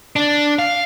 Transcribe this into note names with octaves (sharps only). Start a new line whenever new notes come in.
D4
F5